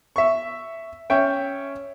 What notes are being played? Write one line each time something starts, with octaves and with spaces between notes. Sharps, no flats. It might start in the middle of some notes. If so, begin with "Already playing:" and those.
E5 C#6
C#4 C#5 E5 G5